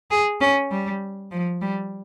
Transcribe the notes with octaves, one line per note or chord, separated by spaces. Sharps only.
G#4
C#4
G3
F3
G3